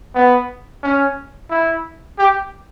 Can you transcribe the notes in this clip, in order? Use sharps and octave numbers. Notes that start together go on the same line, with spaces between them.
B3
C#4
E4
G4